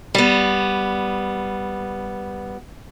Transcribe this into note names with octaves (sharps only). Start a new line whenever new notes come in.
G3 B3